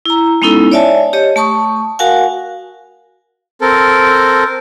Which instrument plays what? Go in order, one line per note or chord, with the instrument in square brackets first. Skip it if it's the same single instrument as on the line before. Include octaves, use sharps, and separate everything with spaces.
[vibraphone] E4 A#5
G#3 B3 C#4 D#4 E4 A4
C#5 D5 E5 G#5 A5
G4 C#5 D#5
A3 A5 C#6 D#6
F#4 A#4 F5 F#5 G#5
[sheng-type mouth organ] C4 A4 A#4